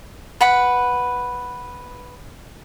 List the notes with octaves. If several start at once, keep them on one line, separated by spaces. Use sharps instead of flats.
B4 F#5 B5